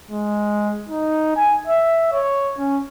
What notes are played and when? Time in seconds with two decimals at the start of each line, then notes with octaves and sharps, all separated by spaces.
0.11 G#3
0.89 D#4
1.36 G#5
1.67 E5
2.13 C#5
2.59 C#4